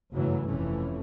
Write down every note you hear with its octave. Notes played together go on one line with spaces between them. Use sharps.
F#1 G2 C#3 E3 F#3 A3
F1 C3 E3 A3 C#4